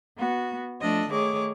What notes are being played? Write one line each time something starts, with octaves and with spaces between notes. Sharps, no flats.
B3 F#4
F3 A3 D4 A4 D#5
D#3 A3 G#4 C#5 D6